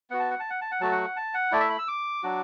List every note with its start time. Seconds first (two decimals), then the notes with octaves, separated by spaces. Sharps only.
0.10 B3 F#4 F#5
0.19 A5
0.30 F#5
0.40 A5
0.50 F#5
0.61 A5
0.71 F#5
0.81 F#3 A3 F#4 A5
0.92 F#5
1.16 A5
1.34 F#5
1.52 A3 E4 D5
1.60 E5
1.69 B5
1.79 E6
1.88 D6
2.23 F#3 D4 F#4